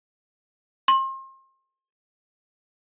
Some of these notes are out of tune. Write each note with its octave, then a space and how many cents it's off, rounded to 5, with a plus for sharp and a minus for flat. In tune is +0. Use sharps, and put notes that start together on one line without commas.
C6 +35